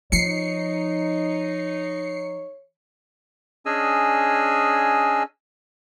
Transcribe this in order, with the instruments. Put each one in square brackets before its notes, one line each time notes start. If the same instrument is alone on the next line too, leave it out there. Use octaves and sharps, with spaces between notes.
[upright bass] F3 [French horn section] D#4 [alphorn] C#5 [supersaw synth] C7 C#7
[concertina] C#4 D4 G#4 D#5 G#5 E6